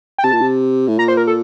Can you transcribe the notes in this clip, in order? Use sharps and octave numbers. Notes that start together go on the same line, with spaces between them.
G5
C3 A5
A#2
C3
A2
A#2 A#5
C5
A#4
A4